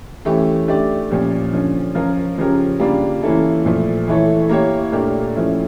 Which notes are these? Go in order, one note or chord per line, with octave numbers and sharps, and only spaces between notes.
E3 A3 C#4 G4
A3 D4 G4 D5
A#2 F3 C#4 G4
D3 F3 C#4
F3 C#4 F4 A#4
C#3 F3 C#4 G4 A#4
C#3 G3 A#3 D4 F4
E3 A#3 C#4 E4 A4
A#2 F3 A3
E3 A3 E4 A4 C#5
A#3 E4 G4 C#5
A#2 A3 D4 G4 A#4
F3 A3 C#4 E4